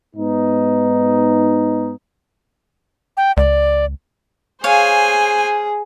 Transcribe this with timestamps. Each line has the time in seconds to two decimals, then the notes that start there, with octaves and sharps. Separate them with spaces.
0.16 G#2 B3 D#4
3.17 G5
3.37 C#2 D5
4.64 G#4 C5 C#5 F5 G#5